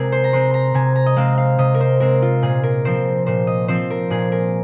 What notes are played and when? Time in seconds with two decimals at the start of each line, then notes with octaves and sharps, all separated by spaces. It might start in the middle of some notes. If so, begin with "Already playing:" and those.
Already playing: C3 G#3 C4 G#4 A#4
0.12 C5
0.24 A#5
0.33 G#3 C4 C6
0.54 A#5
0.74 C3 G#5
0.96 A#5
1.06 D#5
1.16 G#3 C4 F5
1.38 F5
1.58 C3 D#5
1.74 A#4
1.80 C5
2.00 G#3 C4 A#4
2.22 F4
2.42 A#2 G#4
2.63 A#4
2.85 F3 C4 C5
3.26 A#2 C5
3.47 D#5
3.68 F3 C4 C5
3.90 A#4
4.10 A#2 G#4
4.32 A#4